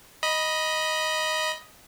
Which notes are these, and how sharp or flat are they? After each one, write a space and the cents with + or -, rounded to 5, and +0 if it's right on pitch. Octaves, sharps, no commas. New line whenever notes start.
D#5 +5 B5 -20